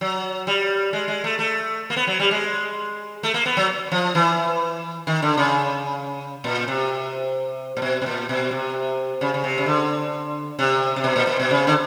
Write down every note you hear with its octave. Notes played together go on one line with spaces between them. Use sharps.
F#3
G3
G#3
G#3
A3
A3
A#3
B3
F#3
G3
G#3
A3
A#3
B3
F#3
F3
E3
D#3
D3
C#3
A#2
C3
A#2
B2
B2
A#2
B2
C3
C#3
C#3
C3
C#3
D3
C3
C3
B2
A#2
A#2
B2
C#3
D3